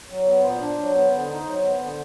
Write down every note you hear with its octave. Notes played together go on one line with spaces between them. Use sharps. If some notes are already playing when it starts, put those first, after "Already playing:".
F#3
B3
A#2 C5
D4
F#3
B3
D3
D#4
F#3
B3
D3